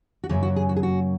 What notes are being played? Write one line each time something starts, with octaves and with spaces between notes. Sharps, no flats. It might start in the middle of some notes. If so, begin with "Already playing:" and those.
F#4
F#2 C#3 F#3 A#3 G#4
F#4
G#4
F#4
G#4
F#4